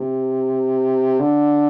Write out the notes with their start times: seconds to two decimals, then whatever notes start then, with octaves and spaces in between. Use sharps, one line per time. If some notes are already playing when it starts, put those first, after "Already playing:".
Already playing: C3
1.20 D3